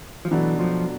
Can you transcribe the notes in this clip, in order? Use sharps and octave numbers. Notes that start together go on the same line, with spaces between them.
F3
B2 E3 F#3 A3 D4 F#4
F3